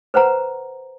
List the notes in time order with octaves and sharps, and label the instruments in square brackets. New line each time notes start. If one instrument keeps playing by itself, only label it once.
[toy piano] B4 C5 F#5 A#5